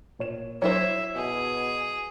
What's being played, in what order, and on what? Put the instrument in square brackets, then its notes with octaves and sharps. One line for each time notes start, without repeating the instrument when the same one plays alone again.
[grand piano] A#2 C#5 E7
[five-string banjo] F#3 E4 C5 [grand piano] C#5 [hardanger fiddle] E5
[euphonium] B2 [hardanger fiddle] G#4